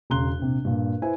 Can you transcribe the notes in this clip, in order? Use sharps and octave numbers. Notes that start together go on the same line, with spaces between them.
E1 C#3 A#5 C6 F#6 G7
A#1 C3
G2 A#2
E4 B4 C5 G#5